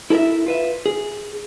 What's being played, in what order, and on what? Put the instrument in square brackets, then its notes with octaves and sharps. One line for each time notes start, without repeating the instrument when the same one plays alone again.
[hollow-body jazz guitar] E4 A4 A#4 D5 E5
F4 B4 E5
G#4